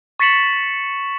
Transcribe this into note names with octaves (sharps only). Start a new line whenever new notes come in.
C#6 A6 B6 C#7 E7 F#7